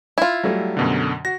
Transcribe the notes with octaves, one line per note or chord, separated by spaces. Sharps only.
E4 F4
F#3 G3 A3
F#2 B2 D3
F#4 A#6